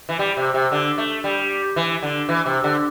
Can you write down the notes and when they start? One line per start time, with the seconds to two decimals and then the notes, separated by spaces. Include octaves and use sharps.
0.09 E3
0.19 G3
0.37 C3
0.54 C3
0.72 D3
0.98 A3
1.24 G3
1.76 E3
2.03 D3
2.29 E3
2.46 C3
2.64 D3